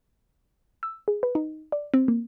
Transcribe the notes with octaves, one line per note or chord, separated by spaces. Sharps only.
E6
G#4
B4
D#4
D5
C4
A#3